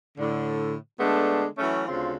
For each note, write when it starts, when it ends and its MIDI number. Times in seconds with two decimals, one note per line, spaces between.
0.18 0.75 45
0.18 0.75 50
1.00 1.46 50
1.00 1.46 56
1.00 1.46 57
1.00 1.46 59
1.00 1.46 62
1.58 1.85 52
1.58 1.85 54
1.58 1.85 57
1.58 1.85 61
1.87 2.15 38
1.87 2.15 49
1.87 2.15 60
1.87 2.15 65